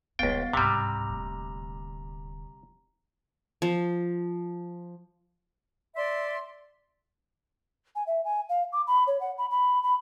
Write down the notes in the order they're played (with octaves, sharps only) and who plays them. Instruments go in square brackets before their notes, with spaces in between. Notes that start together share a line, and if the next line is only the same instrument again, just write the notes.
[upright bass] D#1 G3 [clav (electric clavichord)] C#2 G5 [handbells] B3 F5 A6
[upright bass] C#2 G#2 [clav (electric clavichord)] C3 G3 [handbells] A#5
[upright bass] D#1 D2
[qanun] F3
[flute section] D5 E5 C6
[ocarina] G#5
E5
G#5
F5
D6
B5
C#5
F#5
B5
B5
B5